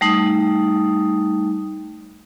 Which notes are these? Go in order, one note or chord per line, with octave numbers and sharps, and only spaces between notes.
G3 A3 D#4 D#6